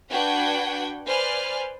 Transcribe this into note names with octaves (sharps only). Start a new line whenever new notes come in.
D4 F#4 B4 F#5 G5 G#6
B4 C5 D5 G#5 F6